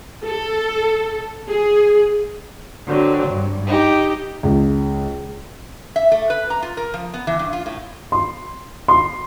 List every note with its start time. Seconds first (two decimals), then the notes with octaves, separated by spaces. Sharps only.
0.23 A4
1.48 G#4
2.88 D3 F#3 C4
3.30 G2
3.67 D#4 G4
4.43 C#2
5.96 E5
6.12 A3
6.30 B4
6.50 A#5
6.62 F4
6.77 A#4
6.94 F3
7.14 B3
7.27 E3
7.39 G2
7.53 F4
7.66 A2
8.12 C6
8.88 C6